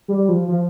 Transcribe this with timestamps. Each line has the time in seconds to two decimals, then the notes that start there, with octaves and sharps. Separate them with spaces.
0.08 G3
0.29 F3
0.48 F3